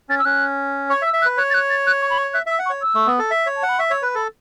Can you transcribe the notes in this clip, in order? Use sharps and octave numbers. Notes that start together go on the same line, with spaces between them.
C#4 A6
E6
C#4 F#6
C#5 C#6
E5
E6
E5
F#6
B4
C#5 F#6
A6
F#6
A6
F#6
C#6
B5
C#6
E5 F#6
E5 E6
F#5
C#6
C#5
E6
A3
B3
A4
E5
C#5
A5
F#5
B5
E5 C#6
C#5 E6
B4 F#6
A4 B5